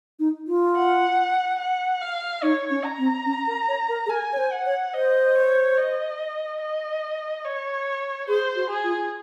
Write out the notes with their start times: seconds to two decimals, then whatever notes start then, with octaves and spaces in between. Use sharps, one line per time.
0.19 D#4
0.47 F4
0.75 F#5
1.59 F#5
2.01 F5
2.43 D#4 C#5
2.70 C#4
2.84 A#5
2.98 C4
3.26 C#4
3.47 A#4
3.68 C#5
3.89 A#4
4.06 G#4
4.09 A#4 G#5
4.33 C#5
4.38 C5
4.52 F#5
4.66 C#5
4.93 C5 D#5
5.35 C#5
5.77 D#5
6.60 D#5
7.44 C#5
8.28 G#4 C5
8.56 F#4
8.70 G#4
8.84 F4